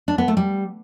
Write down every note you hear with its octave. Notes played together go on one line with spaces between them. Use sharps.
D4
B3
A3
G3